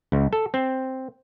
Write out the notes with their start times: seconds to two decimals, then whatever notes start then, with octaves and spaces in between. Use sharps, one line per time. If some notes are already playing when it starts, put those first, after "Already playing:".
0.12 C#2
0.33 A4
0.54 C4